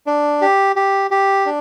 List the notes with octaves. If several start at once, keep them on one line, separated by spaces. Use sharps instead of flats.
D4
G4
G4
G4
D4